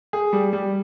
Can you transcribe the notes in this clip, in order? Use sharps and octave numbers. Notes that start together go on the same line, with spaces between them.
G#4
G3
G3